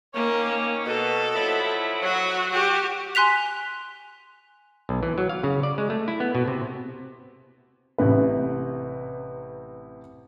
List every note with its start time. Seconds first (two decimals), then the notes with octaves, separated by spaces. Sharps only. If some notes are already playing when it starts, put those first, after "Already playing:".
0.14 D#3 A#3 C#4 C#5
0.86 B2 A4
1.36 F3 F#3 E4
2.02 F#3 F#4
2.52 F#4 G4
3.15 G#5 C6 F#6 B6 F7
4.89 B1
5.03 E3
5.18 F#3
5.29 F5
5.44 C#3
5.63 D5
5.78 G#3
5.90 A3
6.08 E4
6.20 B3
6.35 B2
6.48 C3
7.98 A1 C3 B4